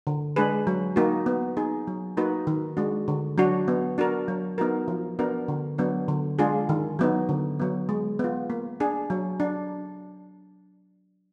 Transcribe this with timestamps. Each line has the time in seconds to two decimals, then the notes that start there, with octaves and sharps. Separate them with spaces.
0.07 D3
0.36 G#3 D4 G#4 B4
0.67 F#3
0.96 A#3 D#4 F#4
1.26 B3
1.57 D#4 G#4
1.87 F#3
2.17 A#3 D#4 F#4 B4
2.47 D#3
2.77 G#3 D4 F#4
3.08 D3
3.38 F#3 D4 F#4
3.68 B3
3.98 D4 F#4 A#4
4.28 F#3
4.58 B3 D#4 F#4 A#4
4.88 F3
5.19 B3 D4 F#4 A#4
5.48 D3
5.78 F#3 B3 D4
6.08 D3
6.39 G#3 D4 F4 G#4
6.69 D#3
6.99 F#3 B3 D#4
7.29 D3
7.60 F#3 B3
7.89 G#3
8.19 B3 F4
8.50 A#3
8.80 D4 G#4
9.10 F#3
9.40 D4